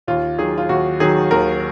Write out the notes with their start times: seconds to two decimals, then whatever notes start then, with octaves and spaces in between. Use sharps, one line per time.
0.07 D#2 F4
0.39 D#3 F#3 G#4
0.58 F4
0.69 D#2 F#4
1.00 D#3 F#3 G#4
1.31 D#2 A#4